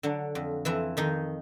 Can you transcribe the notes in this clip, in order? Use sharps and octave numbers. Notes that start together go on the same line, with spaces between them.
D3 F#3 D4
F2
F2 E3 E4
F2 D#3 D#4